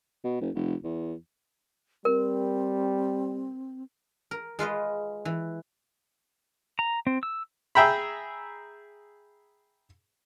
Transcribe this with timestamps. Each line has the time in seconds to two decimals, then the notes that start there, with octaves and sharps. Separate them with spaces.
0.24 B2
0.41 F#1
0.55 F1
0.84 E2
2.05 G3 C4 A#4
4.31 A#4
4.59 G#3 F4 B4 D#5
5.25 E3
6.79 A#5
7.07 C4
7.23 E6
7.75 G#4 E5 G5 A#5 B5